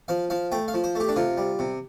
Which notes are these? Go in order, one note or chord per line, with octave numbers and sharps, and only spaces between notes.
F3 F5
F3 F5
A3 G5
F5
F3
C5
A3 G4
D4
C3 F4
G3
C3